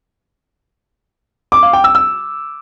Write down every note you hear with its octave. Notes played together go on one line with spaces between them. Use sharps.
D6
F5
G5
E6
E6